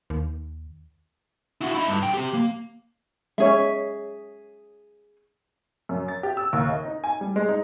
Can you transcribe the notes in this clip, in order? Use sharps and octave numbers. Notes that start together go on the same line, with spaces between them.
D#2
E4 F#4
D#4 E4
G2
D3 G5
C4 G4
A#3
G#3 C#4 G#4 C#5 E5
F#2
A6
G4
E6
D#2
D#5
D#4
G#5
G3
G#3
D#4